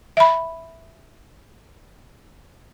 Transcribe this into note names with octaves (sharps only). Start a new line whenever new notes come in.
E5 B5